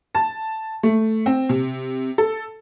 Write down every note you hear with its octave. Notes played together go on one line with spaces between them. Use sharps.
A5
A3
C4
C3
A4